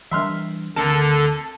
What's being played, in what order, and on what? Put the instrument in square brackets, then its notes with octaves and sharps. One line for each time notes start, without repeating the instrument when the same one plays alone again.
[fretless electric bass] E3 G3 D4 [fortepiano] E5 C6 F6
[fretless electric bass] D2 D#3 C4 [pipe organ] D3 A4 [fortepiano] A#4 [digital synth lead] A5